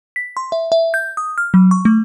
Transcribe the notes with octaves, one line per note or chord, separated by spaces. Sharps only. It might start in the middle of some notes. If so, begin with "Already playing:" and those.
B6
C6
E5
E5
G6
D#6
F6
F#3
C#6
A3